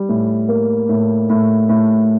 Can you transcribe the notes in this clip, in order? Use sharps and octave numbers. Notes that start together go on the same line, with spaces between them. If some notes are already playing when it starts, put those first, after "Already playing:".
Already playing: G3
A2
A#3
A2
A2
A2